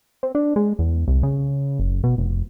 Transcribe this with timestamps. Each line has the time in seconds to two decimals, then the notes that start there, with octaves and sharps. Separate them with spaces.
0.23 C4
0.35 D4
0.56 G#3
0.79 E2
1.08 C2
1.23 C#3
1.79 F#1
2.04 B2
2.18 F1